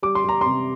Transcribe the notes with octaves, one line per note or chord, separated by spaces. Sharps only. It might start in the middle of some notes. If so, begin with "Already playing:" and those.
G3 D6
C6
G3 A#5
C3 C6